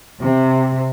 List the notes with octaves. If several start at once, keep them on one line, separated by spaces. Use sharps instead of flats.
C3